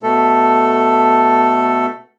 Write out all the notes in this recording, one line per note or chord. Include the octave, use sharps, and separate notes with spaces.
B2 A3 A4